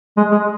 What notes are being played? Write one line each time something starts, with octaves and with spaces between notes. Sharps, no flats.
G#3
G#3